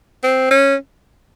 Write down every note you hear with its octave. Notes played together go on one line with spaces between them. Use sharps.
C4
C#4